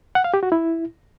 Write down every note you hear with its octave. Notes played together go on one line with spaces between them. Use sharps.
F#5
F5
G4
F#4
E4